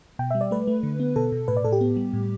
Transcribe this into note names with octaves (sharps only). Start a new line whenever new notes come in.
B2 G5
G3 E5
D5
A3 B4
A3
D3
B3
B2 A4
B2
A2 B4
D5
A2 A4
G4
B3
G3
A2